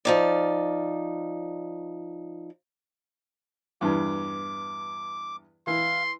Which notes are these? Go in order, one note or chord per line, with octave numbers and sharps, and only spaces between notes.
F3 D#4 D5
E2 G2 D6
E3 F5 C6